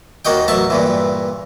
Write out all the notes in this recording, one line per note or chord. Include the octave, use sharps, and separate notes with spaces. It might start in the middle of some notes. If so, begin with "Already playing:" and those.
D#2 A#3 F#4 D#5 G5
A1 F#3 E5 A5
G2 A#2 E3